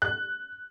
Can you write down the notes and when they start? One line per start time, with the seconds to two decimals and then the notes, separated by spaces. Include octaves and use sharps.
0.02 F#6